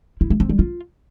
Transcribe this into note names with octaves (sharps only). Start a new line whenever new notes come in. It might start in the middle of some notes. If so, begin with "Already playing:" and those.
E4
A3
C4
G3
F4